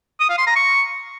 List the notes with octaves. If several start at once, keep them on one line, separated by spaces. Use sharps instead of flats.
D#6
F5
C6
A#5
C#6